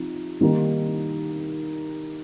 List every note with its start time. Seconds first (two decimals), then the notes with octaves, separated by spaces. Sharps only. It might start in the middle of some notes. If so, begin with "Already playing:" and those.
Already playing: C3 F3 D#4
0.41 D#3 G3 A#3 D#4